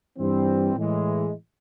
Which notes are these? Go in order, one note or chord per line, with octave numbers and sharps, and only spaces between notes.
G2 E3 G3 C4
A2 E3 G#3